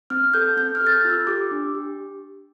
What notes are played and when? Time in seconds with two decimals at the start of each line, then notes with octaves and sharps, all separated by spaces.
0.10 C4 F6
0.34 A4 G6
0.57 C4 G6
0.75 F6
0.81 A4
0.87 A6
0.92 G6
1.05 F4
1.10 E6
1.27 G4 D6
1.51 D4
1.75 G4